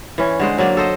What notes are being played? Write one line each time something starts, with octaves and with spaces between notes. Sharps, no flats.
E3 C#4
D3 G#3 C5
F#3 A#3 D5
A4 C5 D#5